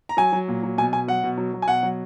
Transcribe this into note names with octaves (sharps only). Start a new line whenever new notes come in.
A#5
F#3 G#5
F#3
A#2
F#3
B2 G#5
B2 G#5
F#3 F#5
B2
F#3
F#3
G#5
B2 F#5
F#3